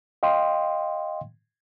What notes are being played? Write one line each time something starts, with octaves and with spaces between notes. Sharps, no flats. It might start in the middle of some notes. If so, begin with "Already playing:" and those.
D#5 F5 G5 C6